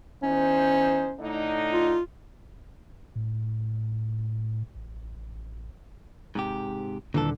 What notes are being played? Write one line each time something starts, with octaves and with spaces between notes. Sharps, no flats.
E2 C#4 D#4 C5
A2 D3 D#4
F4
A2
A1
G#2 C3 G4
D#1 A#2 D3 E3 A4